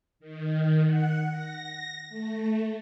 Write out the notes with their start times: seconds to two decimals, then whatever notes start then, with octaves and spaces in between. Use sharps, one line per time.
0.20 D#3
0.85 F#5
1.31 A#6
2.09 A3